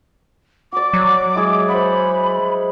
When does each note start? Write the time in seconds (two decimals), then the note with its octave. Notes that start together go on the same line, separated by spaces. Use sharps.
0.73 F#4 D5 D6
0.93 F#3
1.35 G#3 E4 G#4
1.68 C5 E5 F#5 B5